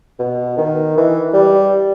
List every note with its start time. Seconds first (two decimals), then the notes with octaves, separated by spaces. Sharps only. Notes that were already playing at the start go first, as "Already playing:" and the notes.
0.19 B2
0.58 D#3
0.97 E3
1.34 G3